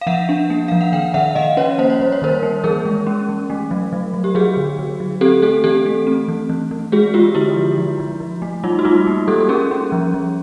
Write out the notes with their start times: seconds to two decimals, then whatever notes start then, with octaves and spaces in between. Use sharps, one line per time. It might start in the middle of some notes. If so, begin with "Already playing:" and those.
0.01 F5
0.07 F3 E5 F#5
0.29 D4
0.50 A#3
0.68 F3 F5
0.81 F#5
0.92 D#3 F5 G5
1.14 D#3 E5 F#5
1.31 F#5
1.35 D#3 D#5 F5
1.57 C#4 B4 C#5
1.78 A#3 C5
1.90 C#5
2.00 G3 C5
2.12 C#5
2.22 D#3 A#4 C5
2.43 A#3
2.64 E3 G#4 A#4
2.85 G#3
3.07 C#4
3.29 E3
3.50 A3
3.71 F#3
3.93 F#3
4.14 F#3
4.24 G4
4.35 F#3 F#4 G#4
4.57 D3
4.78 D3
5.00 F#3
5.21 C4 G4 A4
5.42 A3 G4 A4
5.64 E3 G4 A4
5.86 A3
6.07 C4
6.28 E3
6.49 E3
6.71 E3
6.92 G#3 F#4 G#4
7.14 G#3 F4 G4
7.35 D3 E4 F#4
7.56 F3
7.78 F3
8.00 F3
8.20 F3
8.42 A3
8.64 G3 D#4 F4
8.79 F#4
8.85 G3 D#4 F4
9.07 A#3
9.28 G3 G4 A4
9.40 A4
9.49 C#4 G#4 A#4
9.71 C#4
9.92 F3
10.14 F3